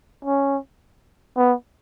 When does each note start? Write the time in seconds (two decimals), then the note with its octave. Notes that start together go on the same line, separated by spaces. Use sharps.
0.25 C#4
1.37 B3